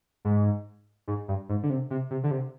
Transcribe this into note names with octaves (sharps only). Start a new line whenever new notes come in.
G#2
G#2
G2
G#2
D3
C3
C3
C3
D3
C3